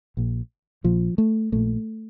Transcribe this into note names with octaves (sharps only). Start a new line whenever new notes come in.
A#1 A#2
A#1 A#2 F3
A3
A#1 A#2 A3